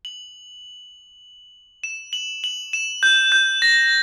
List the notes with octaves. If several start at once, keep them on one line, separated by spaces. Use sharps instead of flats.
F#7
E7
F#7
F#7
E7
G6
G6
A#6